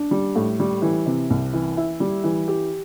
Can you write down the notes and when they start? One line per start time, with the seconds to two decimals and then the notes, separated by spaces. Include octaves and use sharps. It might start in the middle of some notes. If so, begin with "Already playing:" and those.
Already playing: D4
0.11 G3
0.35 A2
0.60 G3
0.82 E3
1.06 C3
1.30 C2
1.53 E3
1.77 E4
2.00 G3
2.24 E3
2.48 G4